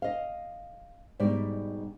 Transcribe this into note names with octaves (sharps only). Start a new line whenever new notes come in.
D#5 F5
G#2 B2 G3 D5